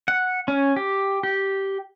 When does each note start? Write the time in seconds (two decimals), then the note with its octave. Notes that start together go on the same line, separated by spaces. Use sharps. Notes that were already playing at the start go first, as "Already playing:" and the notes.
0.08 F#5
0.48 C#4
0.76 G4
1.23 G4